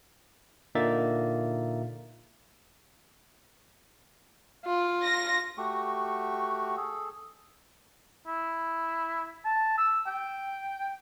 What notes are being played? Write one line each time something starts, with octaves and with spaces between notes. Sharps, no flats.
A#2 D3 A#3 D#4 E5 A6
F4
A#6
A3 F#4 G4 C#6
G#4 A4
E4
A5
E6
G5